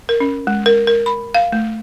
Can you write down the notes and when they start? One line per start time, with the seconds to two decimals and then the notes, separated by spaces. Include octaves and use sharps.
0.09 A#4
0.20 C#4
0.47 G#3
0.66 A#4
0.87 A#4
1.06 B5
1.35 F5
1.52 A3